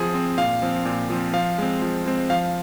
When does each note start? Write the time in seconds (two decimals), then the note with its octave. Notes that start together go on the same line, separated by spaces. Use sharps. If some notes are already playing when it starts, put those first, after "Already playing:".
Already playing: F3 C4 G#4
0.14 C4
0.38 A#2 F5
0.62 F3 C4
0.85 A#2
1.10 F3 C4
1.33 F3 F5
1.58 G#3 C4
1.82 F3
2.06 G#3 C4
2.30 F3 F5